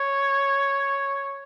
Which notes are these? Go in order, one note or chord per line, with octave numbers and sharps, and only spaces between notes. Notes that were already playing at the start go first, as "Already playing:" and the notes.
Already playing: C#5